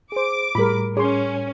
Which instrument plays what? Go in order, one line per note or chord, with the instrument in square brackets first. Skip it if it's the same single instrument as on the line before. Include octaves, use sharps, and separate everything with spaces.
[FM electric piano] G#4 C5 [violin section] D6
[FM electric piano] A2 G3 [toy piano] F4 G#4 [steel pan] A#4 B5
[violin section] C#4 [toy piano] G#4 [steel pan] C#5 C6